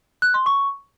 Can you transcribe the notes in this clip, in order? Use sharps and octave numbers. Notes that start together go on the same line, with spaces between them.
F#6
C6
C#6